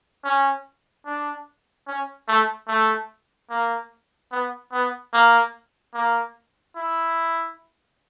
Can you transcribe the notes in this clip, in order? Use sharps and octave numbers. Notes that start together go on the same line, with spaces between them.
C#4
D4
C#4
A3
A3
A#3
B3
B3
A#3
A#3
E4